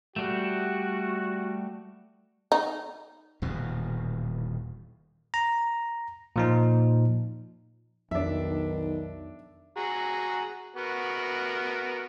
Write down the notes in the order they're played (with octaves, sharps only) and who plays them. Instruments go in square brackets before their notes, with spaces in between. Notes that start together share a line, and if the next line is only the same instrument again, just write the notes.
[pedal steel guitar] G3 A3 [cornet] F#4
[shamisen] D#4
[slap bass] D#1 E2 B2
[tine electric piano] A#5
A#2 F3 D#4
[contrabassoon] B1 [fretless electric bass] F2 [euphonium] D#3 [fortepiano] D4 E5
[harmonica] F#4 G#4 A#5
B3 F#4 A#4